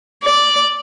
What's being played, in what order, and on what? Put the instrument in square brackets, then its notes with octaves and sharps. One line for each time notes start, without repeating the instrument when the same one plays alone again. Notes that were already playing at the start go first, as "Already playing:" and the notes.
[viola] D5